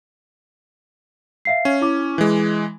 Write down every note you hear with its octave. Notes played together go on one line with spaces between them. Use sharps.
E5 F5 C7
C#4
E4 D6
E3 G#3